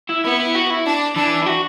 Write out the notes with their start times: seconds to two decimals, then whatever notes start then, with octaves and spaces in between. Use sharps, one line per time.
0.10 E4
0.24 B3 E4
0.40 E4
0.55 F#4
0.70 E4
0.86 D4
1.15 E3 D4
1.42 E4
1.46 F#4